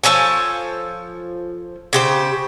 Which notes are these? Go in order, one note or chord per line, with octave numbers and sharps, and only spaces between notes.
F3 A4 C#5 G#5
C#3 G4 C5